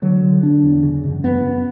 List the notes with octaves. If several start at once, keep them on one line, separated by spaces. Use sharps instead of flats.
D3 F#3
D3
D3 D4
E2
C#3
F#2
F#2 B3
F#2